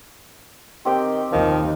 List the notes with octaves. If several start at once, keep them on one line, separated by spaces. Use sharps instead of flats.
D#3 C4 G4 G5
D#2 D#3 F3